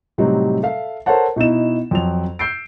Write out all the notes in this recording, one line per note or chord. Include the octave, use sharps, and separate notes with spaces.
A2 C3 F#3 G3 C4 D#4
A4 E5 F5
A4 A#4 C5 C#5 F#5 A5
B2 D#4 E4 E7
F2 F#3 F7
E6 G6 C7 D7